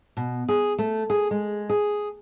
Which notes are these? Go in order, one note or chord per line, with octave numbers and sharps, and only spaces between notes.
B2
G#4
A3
G#4
G#3
G#4